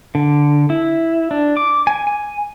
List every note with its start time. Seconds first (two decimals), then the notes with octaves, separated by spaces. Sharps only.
0.15 D3
0.70 E4
1.31 D4
1.57 D6
1.87 G#5
2.07 G#5